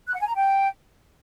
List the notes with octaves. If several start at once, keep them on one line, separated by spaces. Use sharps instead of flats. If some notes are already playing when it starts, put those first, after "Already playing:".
F#6
F#5
G#5
A#5
G5